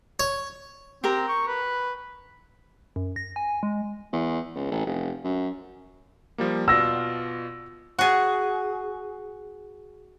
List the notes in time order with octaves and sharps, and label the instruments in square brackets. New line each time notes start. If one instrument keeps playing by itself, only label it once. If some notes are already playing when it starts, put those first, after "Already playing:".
[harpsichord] C#5
[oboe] C4 [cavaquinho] G4 A#4 A#5
[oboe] C#6
B4
[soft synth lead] F#2
A#6
G#5
G#3
[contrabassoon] E2
C#2
A1
F1
F#2
[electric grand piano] F3 G3 A#3
[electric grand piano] B2 F4 D5 [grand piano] E6 A#6
[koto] F#4 G#4